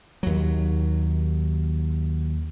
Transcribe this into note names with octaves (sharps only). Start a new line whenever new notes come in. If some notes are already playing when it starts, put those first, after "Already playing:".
D#2 F#3